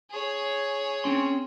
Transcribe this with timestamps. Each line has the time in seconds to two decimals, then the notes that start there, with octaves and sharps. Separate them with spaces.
0.10 G#4 C#5
1.04 C4 C#4 C6